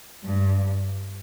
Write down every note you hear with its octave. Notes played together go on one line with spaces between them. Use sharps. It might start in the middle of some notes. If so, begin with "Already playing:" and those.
G2